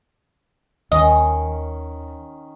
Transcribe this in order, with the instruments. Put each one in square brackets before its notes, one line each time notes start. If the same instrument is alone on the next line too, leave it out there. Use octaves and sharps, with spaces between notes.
[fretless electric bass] D#2 [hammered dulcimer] D#3 C#4 [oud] D#5